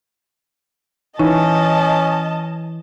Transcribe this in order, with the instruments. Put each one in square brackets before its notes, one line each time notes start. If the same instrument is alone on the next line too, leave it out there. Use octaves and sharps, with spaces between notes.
[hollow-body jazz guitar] E3 [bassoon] C#4 [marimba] D#4 [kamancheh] D#5 A5